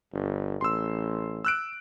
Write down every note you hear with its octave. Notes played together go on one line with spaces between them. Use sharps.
G1
A1 C6 E6
E6 F#6 D7